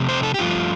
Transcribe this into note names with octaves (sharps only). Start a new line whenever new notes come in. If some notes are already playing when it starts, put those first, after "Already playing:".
Already playing: F2 C3 A3
C5
A4
G4
G2 F3 A3 F4